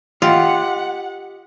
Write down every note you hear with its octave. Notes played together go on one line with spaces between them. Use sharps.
F4 G4 D#5 F#5 G5